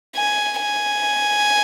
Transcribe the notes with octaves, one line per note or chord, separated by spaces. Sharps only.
G#5
G#5